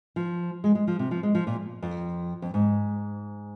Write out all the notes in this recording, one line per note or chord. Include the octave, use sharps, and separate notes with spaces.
F3
G#3
G#3
F3
C3
F3
G#3
F3
A#2
F2
F2
G#2